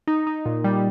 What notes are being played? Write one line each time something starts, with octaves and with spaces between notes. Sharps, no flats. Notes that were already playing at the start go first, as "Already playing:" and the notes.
D#4
D#4
A#2
G3